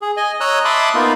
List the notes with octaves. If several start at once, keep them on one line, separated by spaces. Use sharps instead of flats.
G#4
D#5 G#5
C#5 D#5 A#5 D#6 E6 F#6
E5 A5 B5 C6 D6 D#6
A#3 B3 D#4 F4